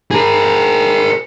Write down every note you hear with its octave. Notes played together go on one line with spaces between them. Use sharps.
G#4 A#4